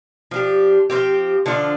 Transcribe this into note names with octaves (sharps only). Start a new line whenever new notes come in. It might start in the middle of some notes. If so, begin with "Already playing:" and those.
F3 D4 G4
F3 C4 G4
D3 F3 D4 F4